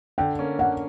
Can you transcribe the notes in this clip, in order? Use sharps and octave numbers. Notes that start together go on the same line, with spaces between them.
D3 G5
A#3 C#4
D3 F#5